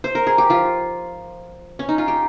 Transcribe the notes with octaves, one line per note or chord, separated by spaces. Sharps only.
C5
A#4
G#4
G4
F3 F4
C#4
D#4
F4
G4